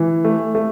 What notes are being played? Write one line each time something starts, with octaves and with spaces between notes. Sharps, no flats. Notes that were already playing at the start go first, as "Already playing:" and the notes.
Already playing: E3
A3
A3